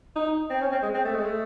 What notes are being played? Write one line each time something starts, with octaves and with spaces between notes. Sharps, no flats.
D#4
C4
C#4
C4
G#3
C4
A3
G#3
A3